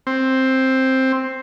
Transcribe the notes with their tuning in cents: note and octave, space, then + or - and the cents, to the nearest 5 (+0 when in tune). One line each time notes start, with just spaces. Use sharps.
C4 +5